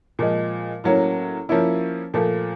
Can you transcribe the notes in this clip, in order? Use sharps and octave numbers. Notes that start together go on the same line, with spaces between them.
A#2 F3 G#3
A2 F#3 A#3 C#4
F3 A#3 C#4 E4
A#2 F3 A3